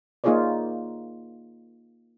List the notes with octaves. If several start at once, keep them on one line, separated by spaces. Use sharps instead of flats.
A#3 D#4 F4 G#4 C#5 D5